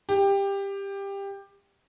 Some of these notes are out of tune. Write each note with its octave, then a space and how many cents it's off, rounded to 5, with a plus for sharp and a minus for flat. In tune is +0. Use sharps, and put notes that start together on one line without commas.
G4 +15